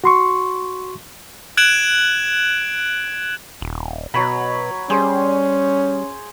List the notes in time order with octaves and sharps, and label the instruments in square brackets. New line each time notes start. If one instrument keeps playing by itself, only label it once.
[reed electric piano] F#4 C6 C#6
[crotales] F#6 G#6 D7 E7 F#7
[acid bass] D#1
[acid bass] B2 [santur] F#3 C#5 B5
[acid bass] G3 [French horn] C#4 [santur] G#4 C5